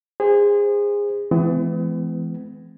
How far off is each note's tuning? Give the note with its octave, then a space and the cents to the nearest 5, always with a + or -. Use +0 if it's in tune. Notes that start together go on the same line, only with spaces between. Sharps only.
G#4 -25 C5 +0
E3 +20 G#3 +45 B3 +40